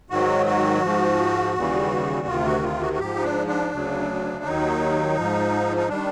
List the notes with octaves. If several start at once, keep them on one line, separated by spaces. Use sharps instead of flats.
G#2 D#3 F#3 F#4
F#4
G#2 F3
D#2 C#3 E3 G3
D2 C3 D#3 F4
F#4
F4
F#4
F#4
G#2 F3 G4
D#4
D4
D4
D2 C#3 F#3
D#2 D#3 F#3 D#4
G#2 F3
D#4
D#3 G3 D4